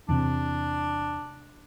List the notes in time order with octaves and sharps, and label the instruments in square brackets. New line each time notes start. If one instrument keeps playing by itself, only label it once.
[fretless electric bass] E2 C3 [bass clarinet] D4